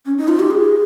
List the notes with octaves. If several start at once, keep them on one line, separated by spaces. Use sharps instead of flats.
C#4
D#4
F4
G4
G#4